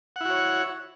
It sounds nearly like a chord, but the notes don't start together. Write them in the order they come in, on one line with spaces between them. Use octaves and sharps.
F#5 E4 F#4 C#5